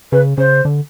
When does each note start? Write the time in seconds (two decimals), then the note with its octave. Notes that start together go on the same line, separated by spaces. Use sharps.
0.12 C#3 B4
0.38 C#3 C5
0.65 D3